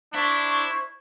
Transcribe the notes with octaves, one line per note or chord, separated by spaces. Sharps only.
D4 E4 C5 E5 C#6 G#6